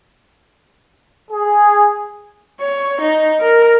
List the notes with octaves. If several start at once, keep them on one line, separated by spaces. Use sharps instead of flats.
G#4
C#5
D#4
A#4